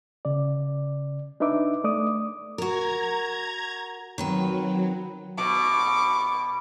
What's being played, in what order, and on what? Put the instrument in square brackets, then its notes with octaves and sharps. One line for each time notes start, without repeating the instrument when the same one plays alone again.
[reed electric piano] C#3 D5
D4 D#4 B4 E5 D6
A3 D5 D6 D#6
[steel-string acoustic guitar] F#4 A#4 [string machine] A#5 G#6
[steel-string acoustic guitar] D#3 C4 B4 [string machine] F#3
[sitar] B2 [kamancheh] C#6 D6